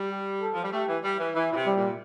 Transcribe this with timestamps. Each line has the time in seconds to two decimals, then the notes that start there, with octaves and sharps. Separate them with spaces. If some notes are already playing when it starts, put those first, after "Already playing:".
Already playing: G3
0.10 G4
0.41 A4
0.54 F3
0.63 G3
0.72 A3 G4
0.88 E3
1.04 G3
1.19 E3
1.35 E3 E4
1.51 A#2
1.56 C3
1.66 G3
1.77 A#2